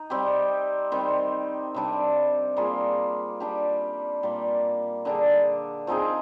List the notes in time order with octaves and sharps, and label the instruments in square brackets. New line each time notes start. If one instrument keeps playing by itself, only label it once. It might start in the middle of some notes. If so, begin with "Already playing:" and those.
Already playing: [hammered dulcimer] D#4
G3 C4 G4
D#3 G3 C4
C3 G3 D4
G3 A#3 F4 G#4
G3 D4 G4
A#2 G3 A#3 F4
D3 G3 D4 G#4
F3 C4 D#4 G#4